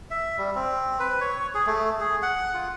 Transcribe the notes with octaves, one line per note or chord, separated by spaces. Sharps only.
E5
G3
C4
B4
C#5
G#4
A3
G#4
F#5
F4